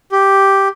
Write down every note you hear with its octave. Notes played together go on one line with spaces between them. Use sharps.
G4